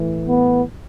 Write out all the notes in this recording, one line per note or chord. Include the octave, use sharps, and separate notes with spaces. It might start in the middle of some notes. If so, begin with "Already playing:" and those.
Already playing: A2 E3
B3